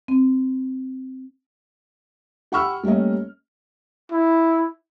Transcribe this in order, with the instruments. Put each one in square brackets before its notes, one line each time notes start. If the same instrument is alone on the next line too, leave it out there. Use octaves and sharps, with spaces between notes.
[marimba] C4
[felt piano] G4 F#5 B5 C#6 E6 F6
G3 A3 A#3 C#4 D#5
[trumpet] E4